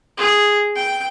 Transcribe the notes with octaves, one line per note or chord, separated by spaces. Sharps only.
G#4
G5